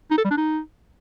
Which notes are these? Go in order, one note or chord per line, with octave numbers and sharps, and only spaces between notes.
D#4
A4
G3
D4
D#4